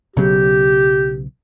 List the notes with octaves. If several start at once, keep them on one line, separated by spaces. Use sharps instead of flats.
B1 C#3 F#3 G4